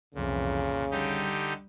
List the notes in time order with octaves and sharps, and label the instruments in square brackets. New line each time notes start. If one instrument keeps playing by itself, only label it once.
[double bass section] C2 F2 E3 [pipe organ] A#2 [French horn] C#3
[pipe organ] D3 D#4 G4 [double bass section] G3